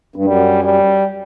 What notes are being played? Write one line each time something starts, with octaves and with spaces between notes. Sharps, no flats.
G2
F#2 G3
G3